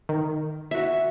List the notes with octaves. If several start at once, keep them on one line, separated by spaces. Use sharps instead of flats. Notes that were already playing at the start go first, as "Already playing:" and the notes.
D#3
F#4 E5